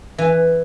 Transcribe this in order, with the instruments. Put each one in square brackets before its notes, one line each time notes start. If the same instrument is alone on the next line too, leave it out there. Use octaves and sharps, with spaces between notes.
[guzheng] E3